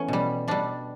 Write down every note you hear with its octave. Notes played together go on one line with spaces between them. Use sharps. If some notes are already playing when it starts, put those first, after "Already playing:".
Already playing: E3 A3 B3 C#4
B2 G3
B2 G3 D4